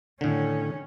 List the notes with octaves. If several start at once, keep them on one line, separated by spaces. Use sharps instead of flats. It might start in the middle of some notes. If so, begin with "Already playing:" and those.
A2 D3 D#3 C#4